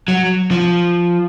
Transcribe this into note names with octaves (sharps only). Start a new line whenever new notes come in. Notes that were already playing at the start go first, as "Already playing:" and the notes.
F#3
F3